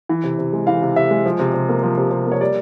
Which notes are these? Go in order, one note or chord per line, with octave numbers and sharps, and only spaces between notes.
E3
C3
C3
G#3
E3 F5
C3
C3 E5
G#3
F3
C3
C3
A#3
F3
C3
C3
A#3
C#5
G3 D5